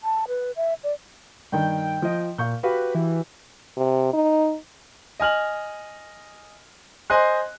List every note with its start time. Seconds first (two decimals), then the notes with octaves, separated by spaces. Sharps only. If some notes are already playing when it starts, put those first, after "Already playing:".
0.04 A5
0.28 B4
0.56 E5
0.83 D5
1.52 G2 D#3 G5
2.02 F3 D#5
2.38 A#2 F5 C#6 G6
2.63 F#4 G4 B4 F5
2.95 E3
3.77 C3
4.13 D#4
5.20 D#5 G#5 F6 F#7
7.10 C5 D#5 G#5 C6 F#6